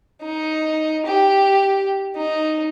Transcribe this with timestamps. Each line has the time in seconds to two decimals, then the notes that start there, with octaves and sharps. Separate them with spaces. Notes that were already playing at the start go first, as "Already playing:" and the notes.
0.22 D#4
1.06 G4
2.16 D#4